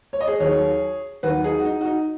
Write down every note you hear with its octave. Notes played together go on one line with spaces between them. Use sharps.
C#5
D#5
G#4 C#5
D#2 D#3 F#3 G#4 C#5
D#2 D#3 F#3 F#4 B4
D#4 G#4
F#4
D#4
F#4
D#4